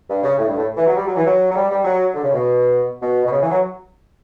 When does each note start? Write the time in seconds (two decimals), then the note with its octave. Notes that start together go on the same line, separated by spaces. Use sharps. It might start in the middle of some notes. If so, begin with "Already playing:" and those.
0.09 G2
0.23 C#3
0.38 A2
0.47 G2
0.57 A2
0.77 E3
0.87 F#3
0.96 G3
1.06 F#3
1.16 E3
1.26 F#3
1.50 F#3
1.55 G3
1.70 G3
1.85 F#3
2.14 D3
2.24 C#3
2.33 B2
3.02 B2
3.25 B2
3.32 C#3
3.42 E3
3.51 F#3